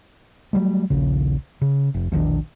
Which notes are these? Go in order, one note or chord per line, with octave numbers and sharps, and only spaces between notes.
F#3 G3 A3
D#1 A#1 C#3
C#3
F1
E1 A#1 D#3 D4